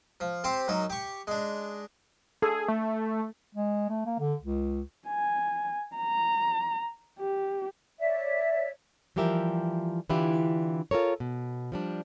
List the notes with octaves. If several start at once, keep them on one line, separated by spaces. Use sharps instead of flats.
F3
C4 G4 C5
F#2 F#3 D#4
G4 C#6
G#3 D4
G#4 A4
A3
G#3
A3
A#3
D3
C#2
G#5
A#5
G4
C#5 D5 E5
E3 F3 G3 G4 A#4 E5
D3 E3 D4 E4 F4 G4
F4 A4 A#4 C#5
B2
F3 G3 D4